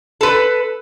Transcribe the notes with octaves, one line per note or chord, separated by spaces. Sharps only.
A4 B4